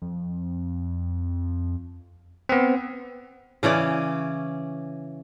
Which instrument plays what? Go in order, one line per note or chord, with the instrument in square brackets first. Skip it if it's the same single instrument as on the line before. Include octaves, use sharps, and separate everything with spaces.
[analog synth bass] F2
[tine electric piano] B3 C4
[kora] C#3 E3 C#4 D5